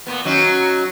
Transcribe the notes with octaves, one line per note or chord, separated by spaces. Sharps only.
A#2 B3
F#3 C#4 D#4